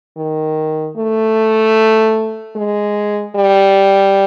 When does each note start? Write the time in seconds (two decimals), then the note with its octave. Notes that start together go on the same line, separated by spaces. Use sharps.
0.17 D#3
0.97 A3
2.56 G#3
3.35 G3